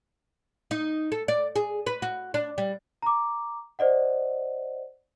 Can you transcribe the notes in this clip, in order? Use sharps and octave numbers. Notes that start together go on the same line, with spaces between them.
D#4
A4
D5
G#4
B4
F#4
D4
G3
A#5 D6
C5 D5 D#5 F#5